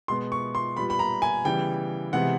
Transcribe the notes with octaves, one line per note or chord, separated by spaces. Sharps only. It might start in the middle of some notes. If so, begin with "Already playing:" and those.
B2 G#3 B3 C6
C#6
C6
A#2 G3 B3 B5
B5
A#5
G#5
C#3 E3 G3 B3 G5
C3 E3 G#3 B3 F#5